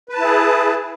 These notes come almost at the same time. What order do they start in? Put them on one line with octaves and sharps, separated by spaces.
B4 A5 E4 G#4